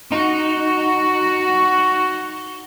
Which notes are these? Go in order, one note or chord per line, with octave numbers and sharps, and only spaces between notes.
D#4 F#4